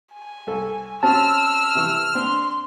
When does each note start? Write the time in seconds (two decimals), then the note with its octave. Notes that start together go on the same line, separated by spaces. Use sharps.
0.14 G#5
0.47 C2 A4
1.03 C4 C#4 F#4 A5 E6 F6
1.75 C3 E3 C#6
2.15 C4 D4 C6